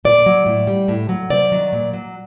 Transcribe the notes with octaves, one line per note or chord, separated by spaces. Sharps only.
A#2 D5
F#3
A2
G3
A2
F#3
C3 D5
D#3 F#3
A#2
F#3